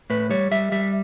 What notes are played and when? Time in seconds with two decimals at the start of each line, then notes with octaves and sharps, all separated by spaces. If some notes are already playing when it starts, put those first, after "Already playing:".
0.10 A2 B4
0.30 G3 C#5
0.51 G3 E5
0.72 G3 E5